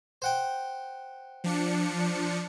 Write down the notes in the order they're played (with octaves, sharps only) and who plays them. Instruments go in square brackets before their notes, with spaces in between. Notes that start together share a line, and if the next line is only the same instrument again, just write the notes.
[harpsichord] C5 F#5 G5
[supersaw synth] F3 D4 C#7